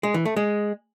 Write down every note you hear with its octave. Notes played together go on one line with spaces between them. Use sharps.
G#3
E3
A3
G#3